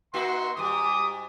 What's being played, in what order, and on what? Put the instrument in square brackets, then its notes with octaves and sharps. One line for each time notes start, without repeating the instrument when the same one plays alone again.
[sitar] A#3 D#4 F#4 [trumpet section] E5 F#5 C6
[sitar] G#2 G3 [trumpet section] D6 D#6